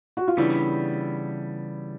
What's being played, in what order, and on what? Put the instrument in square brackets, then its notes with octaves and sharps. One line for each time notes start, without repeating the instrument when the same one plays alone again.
[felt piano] F#4
F4
[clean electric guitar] C#3 E3 G3 B3 [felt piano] D4 E4